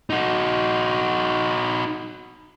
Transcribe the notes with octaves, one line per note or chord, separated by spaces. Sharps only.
D#4 F#4